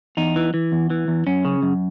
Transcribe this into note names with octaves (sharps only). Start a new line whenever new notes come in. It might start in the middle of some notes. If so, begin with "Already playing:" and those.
E2 D#4
E3
E3
E2
E3
E2
F#2 C#4
C#3
F#2